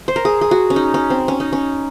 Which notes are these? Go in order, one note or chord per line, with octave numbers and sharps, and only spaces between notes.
C5
A#4
G#4
G#4
F#4
C#4
D#4
C#4
C4
C#4
D#4
C#4